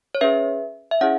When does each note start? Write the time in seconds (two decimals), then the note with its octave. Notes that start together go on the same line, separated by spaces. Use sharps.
0.15 C#5
0.21 C#4 G#4 B4 E5
0.91 E5
1.01 C#4 E4 G#4 C#5 F#5